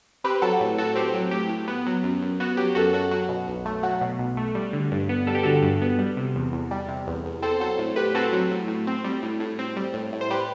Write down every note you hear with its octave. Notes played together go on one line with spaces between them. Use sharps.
C4 G4 B4
F#3 F#4 A4
A2
A2 F#4 A4
C4 G4
F#3
A2 G4
A2
B3
F#3
F#2
F#2
B3 F#4
F#3 G4
F#2 F#4 A4
F#2 F#4 A4
F#3 F#4
B2
B1
A3
F#3 F#4
B2
B1
A3
G3
D3
G2
B3
G3 A4
G4
D3 F#4 A4
G2
B3
G3
C3
E2
E2
G3
C3
E2
E2
C4 A4 C5
F#3 A4 C5
A2
A2 G4 B4
C4 F#4 A4
F#3
A2
A2
C4
G3
A2
A2
C4
G3
A2
A2
C5
G3 G4 B4